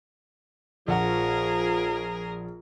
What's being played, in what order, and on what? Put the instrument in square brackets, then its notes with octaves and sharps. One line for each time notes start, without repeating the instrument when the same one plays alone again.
[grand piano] A#1 F#5 [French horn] F3 [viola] G#4 A#4